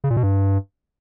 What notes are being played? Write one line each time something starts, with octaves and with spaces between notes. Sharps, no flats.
C#3
A#2
B2
G2